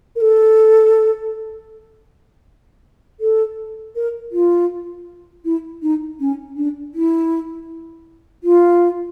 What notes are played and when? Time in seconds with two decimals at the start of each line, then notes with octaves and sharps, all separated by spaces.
0.16 A#4
0.21 A4
3.20 A4
3.95 A#4
4.32 F4
5.45 E4
5.82 D#4
6.20 C#4
6.56 D4
6.94 E4
8.43 F4